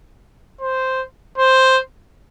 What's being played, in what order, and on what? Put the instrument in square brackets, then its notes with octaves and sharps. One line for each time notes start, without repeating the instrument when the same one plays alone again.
[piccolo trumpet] C5
C5